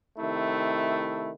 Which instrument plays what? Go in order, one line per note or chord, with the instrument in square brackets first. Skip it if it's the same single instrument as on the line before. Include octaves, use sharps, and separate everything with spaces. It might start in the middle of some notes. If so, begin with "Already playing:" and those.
[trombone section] C3 D#3 A3 E4